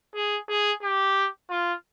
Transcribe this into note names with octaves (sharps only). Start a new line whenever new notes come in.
G#4
G#4
G4
F4